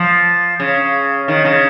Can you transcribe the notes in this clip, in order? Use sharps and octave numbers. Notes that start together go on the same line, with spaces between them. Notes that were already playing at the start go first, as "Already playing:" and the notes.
Already playing: F3
C#3
D#3
C#3